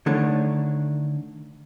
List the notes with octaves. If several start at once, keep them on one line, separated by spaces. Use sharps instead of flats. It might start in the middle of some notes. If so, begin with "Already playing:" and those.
D3 D#3 A3 D4 C#5